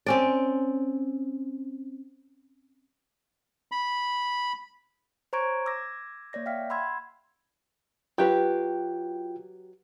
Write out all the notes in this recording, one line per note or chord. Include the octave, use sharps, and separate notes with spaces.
C4 C#4 D5
B5
C5 C#5 A#5 C#6 G#6 D7
D6 E6 G#6 A#6
A#3 C#5 D5 A#6
E5 F5 G5 F6 B6
F#5 B5 C6 E6 G#6
F#3 F4 G4 B4 G5